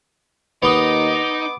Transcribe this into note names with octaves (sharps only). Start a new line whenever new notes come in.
D#2 B3 D#4 D6 D#6